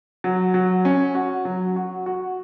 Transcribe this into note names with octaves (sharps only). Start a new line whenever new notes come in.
F#3
F#3
C#4
F#4
F#3
F#4
F#4